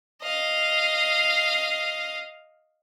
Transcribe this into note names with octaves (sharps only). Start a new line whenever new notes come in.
D#5 F5